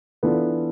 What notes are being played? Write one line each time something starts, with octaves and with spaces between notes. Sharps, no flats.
E3 B3 D4 F4 A4